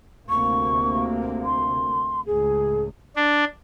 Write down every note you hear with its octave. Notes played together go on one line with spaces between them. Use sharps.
D2 C3 A#3 C#6
C6
C#2 A2 G#4
D4